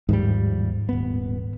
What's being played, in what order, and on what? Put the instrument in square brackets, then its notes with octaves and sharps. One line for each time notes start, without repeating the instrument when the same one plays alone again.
[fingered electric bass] D#2 F3 G3 [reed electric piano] G#2
[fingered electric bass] D#1 B3